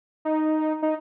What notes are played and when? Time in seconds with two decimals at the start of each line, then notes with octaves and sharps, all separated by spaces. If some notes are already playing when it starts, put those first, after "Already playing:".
0.25 D#4
0.82 D#4